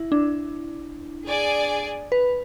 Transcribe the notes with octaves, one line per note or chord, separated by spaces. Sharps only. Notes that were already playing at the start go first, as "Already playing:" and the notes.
Already playing: E4
D4
G#4 D5 G#5
B4